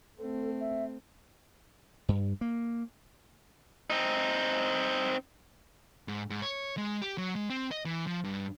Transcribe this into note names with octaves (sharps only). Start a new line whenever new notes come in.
A3 C4 A4
E5
G2
A#3
C4 D#4
G#2
G#2
C#5
G#3
G4
F#3
G#3
C4
D#5
E3
F3
G2